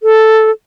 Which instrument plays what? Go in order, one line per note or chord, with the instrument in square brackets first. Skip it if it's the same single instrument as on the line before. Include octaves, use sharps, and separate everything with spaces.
[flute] A4